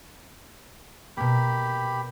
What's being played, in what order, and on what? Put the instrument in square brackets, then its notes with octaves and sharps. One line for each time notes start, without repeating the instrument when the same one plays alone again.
[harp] B2 A#3 [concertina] G4 B5